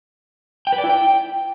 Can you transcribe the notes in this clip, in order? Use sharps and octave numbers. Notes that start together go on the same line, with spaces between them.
G5
B4
D5
E4
G5